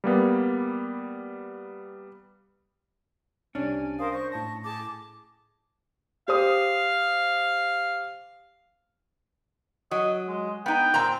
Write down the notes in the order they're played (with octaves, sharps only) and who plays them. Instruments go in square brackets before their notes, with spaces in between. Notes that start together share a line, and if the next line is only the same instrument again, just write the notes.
[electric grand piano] G3 A#3 B3
[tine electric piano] C2 C3 [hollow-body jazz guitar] C#4 D4 [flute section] G#5
[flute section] A#4 C5 F5 [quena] D#6
[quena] C5 [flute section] C#6 [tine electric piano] A#6
[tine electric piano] A2 A#6 [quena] A5 [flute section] C#6
[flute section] G#4 A5 [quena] D6
[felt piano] G4 C5 D#6 [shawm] F5
[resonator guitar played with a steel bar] F#3 [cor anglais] D#5
[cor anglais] G#3
[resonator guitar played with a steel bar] B3 D#4 [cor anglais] G5
[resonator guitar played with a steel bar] A#2 C4 A#5